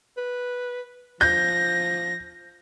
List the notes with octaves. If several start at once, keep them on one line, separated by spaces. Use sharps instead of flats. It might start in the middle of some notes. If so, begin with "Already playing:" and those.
B4
F3 G6 A#6